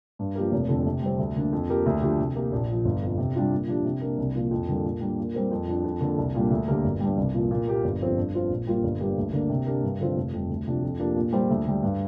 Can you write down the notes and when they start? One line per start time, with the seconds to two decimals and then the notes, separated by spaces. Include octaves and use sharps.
0.19 G2
0.35 F3 A#3 G4 A#4
0.52 F1
0.69 F2 D3
0.86 C3
1.02 G3 C4
1.18 D2
1.36 D3 A#3 D4
1.53 F2
1.69 F3 A#3 G4 A#4
1.86 D2
2.02 D3 F3 D4 G4
2.18 C3
2.36 A#3 G4
2.52 A#1
2.69 A#2 F3
2.85 G1
3.02 F2 F3
3.18 C3
3.35 G3 D4 F4
3.52 A#2
3.68 F3 D4 G4
3.85 C3
4.01 A#3 D4 A#4
4.18 C2
4.34 A#2 F3 A#3 F4
4.51 F2
4.68 D3 G3 A#3
4.84 A#2
5.01 G3 A#3 D4
5.18 A#2
5.34 G3 C4 G4 A#4
5.51 F2
5.68 F3 D4
5.84 F2
6.01 D3 A#3
6.18 C2
6.35 A#2 G3 A#3 D4
6.51 D2
6.68 D3 A#3 G4 A#4
6.84 G1
7.00 G2 G3
7.18 C2
7.33 A#2 F3
7.51 A#2
7.67 A#3 G4 A#4
7.84 G1
8.01 F2 F3 C4
8.17 G2
8.34 F3 C4 F4 C5
8.50 A#1
8.67 A#2 G3 A#3 F4
8.84 G1
9.00 G2 G3 A#3 G4
9.17 D2
9.33 D3 A#3 D4 A#4
9.49 C3
9.66 A#3 D4 G4 A#4
9.83 G2
10.00 D3 F3 C4 F4
10.16 F1
10.33 F2 C3 G3
10.49 D2
10.67 C3 F3 D4
10.83 F2
10.99 F3 A#3 D4 G4
11.16 A#2
11.32 G3 A#3 F4 C5
11.50 D2
11.65 D3 G3
11.83 G2